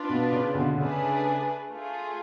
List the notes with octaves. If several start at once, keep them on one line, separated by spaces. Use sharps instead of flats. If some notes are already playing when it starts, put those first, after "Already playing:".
Already playing: D4 F4 B4
B2
C#3
B2 D3
B2
C#3 A3 D4 G#4 B4
A3 F4 G#4